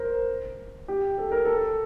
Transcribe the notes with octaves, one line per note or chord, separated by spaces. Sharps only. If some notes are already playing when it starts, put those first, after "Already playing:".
Already playing: A#4 C5
G4
A4
A#4
A4